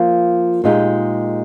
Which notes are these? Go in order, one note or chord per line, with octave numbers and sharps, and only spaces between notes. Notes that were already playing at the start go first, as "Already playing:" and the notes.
Already playing: F3 A#3 F4
A#2 G#3 D#4 G4